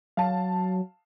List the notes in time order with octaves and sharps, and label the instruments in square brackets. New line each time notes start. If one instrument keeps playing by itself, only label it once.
[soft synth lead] F#3 [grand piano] F5 A5